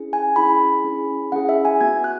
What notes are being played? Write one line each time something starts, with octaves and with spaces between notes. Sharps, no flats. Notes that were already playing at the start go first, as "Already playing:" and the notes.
Already playing: C#4 E4 G#4
G#5
C#4 E4 G#4 B5
C#4 E4 G#4
C#4 E4 G#4 F#5
E5
G#5
B3 F#4 G#6
F#6